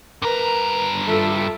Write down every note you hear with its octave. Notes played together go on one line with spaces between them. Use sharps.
G2 A#4 B4 A#5
F4 A4 E5